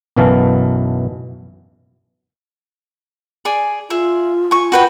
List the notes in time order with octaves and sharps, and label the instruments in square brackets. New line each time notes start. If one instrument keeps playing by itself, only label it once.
[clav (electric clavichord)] B1 F#2 B2 E3 F5 A5
[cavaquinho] G#4 D5 G#5
[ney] F4 [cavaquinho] G#4 E5
[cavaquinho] G#5 C#6
F#4 B4 G5